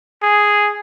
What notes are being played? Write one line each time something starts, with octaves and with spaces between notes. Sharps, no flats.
G#4